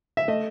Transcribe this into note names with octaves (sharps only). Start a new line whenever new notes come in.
E5
A3 D#5